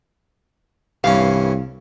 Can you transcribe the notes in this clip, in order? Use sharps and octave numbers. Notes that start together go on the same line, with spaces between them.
C2 G2 E3 C#4 F5